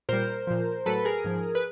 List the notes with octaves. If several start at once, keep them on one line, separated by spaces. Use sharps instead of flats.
A#2 G3 A#4 C5
A#2 F3
A2 F#3 A4 B4
G#4 A#4
G#2 F3
B4